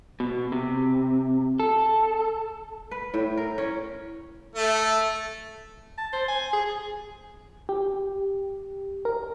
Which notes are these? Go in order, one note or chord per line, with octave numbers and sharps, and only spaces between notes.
B2
C3
A4
B4
A2
A#4
C#4
A3
A5
C5
G#5
G#4
G4
A#4